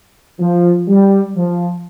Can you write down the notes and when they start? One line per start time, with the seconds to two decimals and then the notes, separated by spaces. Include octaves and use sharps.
0.40 F3
0.88 G3
1.36 F3